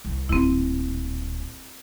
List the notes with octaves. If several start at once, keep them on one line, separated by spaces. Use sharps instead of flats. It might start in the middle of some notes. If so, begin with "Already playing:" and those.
C2
D1 A#2 C4 E4